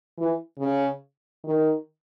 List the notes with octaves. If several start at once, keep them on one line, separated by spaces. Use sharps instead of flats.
E3
C#3
D#3